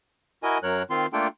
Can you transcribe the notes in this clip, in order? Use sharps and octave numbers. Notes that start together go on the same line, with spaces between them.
E4 F#4 A#4 D#5 G#5
F#2 F#3 A#4 C#5 F#6
D#3 C4 F4 C6
A3 A#3 D4 F4 A4 G5